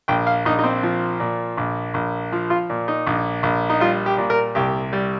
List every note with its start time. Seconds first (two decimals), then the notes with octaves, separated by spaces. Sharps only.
0.08 A#1 G5
0.27 F5
0.45 A#1 D#4
0.59 D#4
0.64 C4
0.83 F3
1.20 A#2
1.57 A#1
1.94 A#1
2.32 F3
2.50 F4
2.70 A#2
2.88 D#4
3.07 A#1
3.43 A#1
3.70 D#4
3.80 G3 F4
4.06 G4
4.18 A#2
4.30 A#4
4.55 C2 G4
4.93 G3